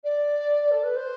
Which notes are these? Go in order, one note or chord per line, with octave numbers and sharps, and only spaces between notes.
D5
A4
B4
C5